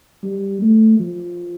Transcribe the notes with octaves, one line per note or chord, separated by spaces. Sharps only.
G3
A3
F3